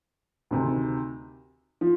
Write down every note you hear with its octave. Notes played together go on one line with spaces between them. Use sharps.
D2 C3 D#3
F3